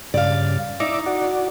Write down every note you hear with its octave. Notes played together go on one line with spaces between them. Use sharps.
G2 C#3 D5 F5
D#4 D5 E5 D6
F#4 D5